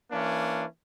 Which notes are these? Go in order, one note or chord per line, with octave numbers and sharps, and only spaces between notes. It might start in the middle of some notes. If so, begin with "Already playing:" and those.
E3 A#3 C#4 D4